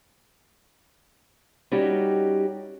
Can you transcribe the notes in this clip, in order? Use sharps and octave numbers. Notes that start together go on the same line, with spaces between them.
G3 C#4 D#4 F#4 G4